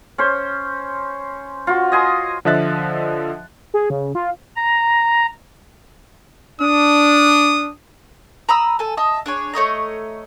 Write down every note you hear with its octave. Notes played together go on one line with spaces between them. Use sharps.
C#4 C5
F4 F#4
D#5 G#5 C6
D3 F3 D#5 E5 F#6 A6
G#4
C#3
F4
A#5
D4 D#6
A#5 B5 D#6 E6
A4 G#5
D#5 E5 A5 D#6
D4 G#4 C#5
A3 C#5 D#5 A#5